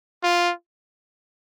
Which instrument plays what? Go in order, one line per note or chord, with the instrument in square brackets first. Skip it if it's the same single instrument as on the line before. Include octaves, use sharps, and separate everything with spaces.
[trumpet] F4